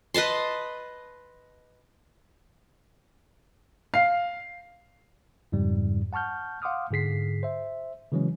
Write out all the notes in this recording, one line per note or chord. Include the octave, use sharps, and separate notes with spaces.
B4 D#5 A5 C6
F5 C7
F2 G#2 C#3 G3
F#5 A5 C#6 F6 G6
F5 F#5 C6 D6 D#6 F6
G#2 D3 G#4 B6 C7
C5 E5
C#3 E3 F#3 G#3 C#4